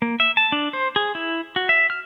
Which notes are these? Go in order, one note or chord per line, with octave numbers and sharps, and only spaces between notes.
A#3
E5
A5
D4
C5
G#4
E4
F#4
E5
F6